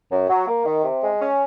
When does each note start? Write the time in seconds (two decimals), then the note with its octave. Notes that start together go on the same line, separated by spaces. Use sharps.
0.12 F#2
0.30 F#3
0.47 A#3
0.65 D#3
0.83 C3
1.02 G#3
1.20 C#4